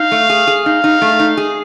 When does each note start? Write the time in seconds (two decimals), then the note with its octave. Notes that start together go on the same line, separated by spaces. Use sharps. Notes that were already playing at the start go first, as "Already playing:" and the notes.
Already playing: D#4 F5
0.12 A3
0.30 G#4
0.47 G#4
0.66 D#4 F5
0.84 D#4
1.02 A3
1.20 D#4
1.37 G#4